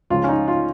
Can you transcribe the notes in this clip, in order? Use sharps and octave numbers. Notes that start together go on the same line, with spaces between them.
C#2 C#3 F3 F4
C#4
D#4
F4